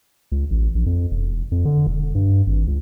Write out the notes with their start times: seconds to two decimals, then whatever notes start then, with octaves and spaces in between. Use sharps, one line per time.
0.32 C#2
0.50 A1
0.75 A#1
0.86 F2
1.11 E1
1.52 F2
1.65 D3
1.87 E1
2.15 G2
2.47 G#1
2.67 C#2